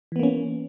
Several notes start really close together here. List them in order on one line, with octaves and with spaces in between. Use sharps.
E3 B3 A#3 C#4